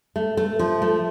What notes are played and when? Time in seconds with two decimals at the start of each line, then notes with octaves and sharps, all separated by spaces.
0.16 A3
0.37 A3
0.59 F3
0.82 A3